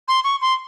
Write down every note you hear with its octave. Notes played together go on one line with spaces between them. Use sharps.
C6
C#6
C6